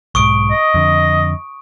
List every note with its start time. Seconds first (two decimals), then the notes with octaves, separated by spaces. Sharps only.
0.15 B1 G#2 C#6 D#6 D7
0.51 D#5
0.74 F2 D3